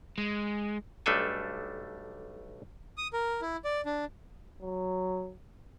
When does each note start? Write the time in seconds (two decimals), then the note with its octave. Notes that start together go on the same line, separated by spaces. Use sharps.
0.18 G#3
1.06 B1 G3 A3 D4 A4 G#5
2.98 D#6
3.13 A#4
3.42 E4
3.64 D5
3.86 D4
4.62 F#3